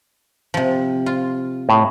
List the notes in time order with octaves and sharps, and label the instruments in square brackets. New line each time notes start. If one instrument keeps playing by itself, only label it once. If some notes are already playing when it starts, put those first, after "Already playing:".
[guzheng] C3 F3
F4
[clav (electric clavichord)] A2